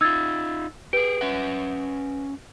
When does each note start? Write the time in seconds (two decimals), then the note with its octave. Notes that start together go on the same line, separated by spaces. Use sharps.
0.01 D#4 F4 E6 G#6 A6
0.93 G4 G#4 B4 D7
1.21 C#4 E5 F#5